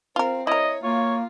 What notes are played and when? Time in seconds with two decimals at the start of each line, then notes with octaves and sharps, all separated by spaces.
0.16 C4 F4 A#4 C5
0.47 E4 A#4 C#5 D#5
0.84 A#3 F4 C#5